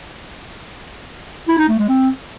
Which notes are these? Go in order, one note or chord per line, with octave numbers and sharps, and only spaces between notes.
E4
D#4
A3
G#3
C4